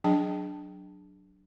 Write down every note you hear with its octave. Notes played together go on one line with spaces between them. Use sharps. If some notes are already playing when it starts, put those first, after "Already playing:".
F#3 D4 G#4 D#5 G5 A5